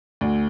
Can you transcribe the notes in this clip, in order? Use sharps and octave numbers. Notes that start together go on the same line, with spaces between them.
D2